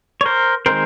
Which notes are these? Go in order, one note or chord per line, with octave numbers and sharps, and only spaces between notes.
C#5
A#4 C5
D#3 G#3 C4 A#4 C5